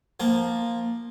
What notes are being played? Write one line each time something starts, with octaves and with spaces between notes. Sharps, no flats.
F3 A#3